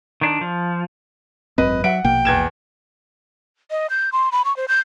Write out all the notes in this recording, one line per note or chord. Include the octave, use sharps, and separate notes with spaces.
D#3 D4
F3
G#1 F#2 C4 B4 D#5
F#3 E5 F#5 D7
A#1 B2 A#3 G5
E2 G#6 E7
D#5
G6
C6
B5
C#6
C5
G6